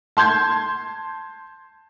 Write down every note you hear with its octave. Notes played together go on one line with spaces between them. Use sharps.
A5 C6 G6 G#6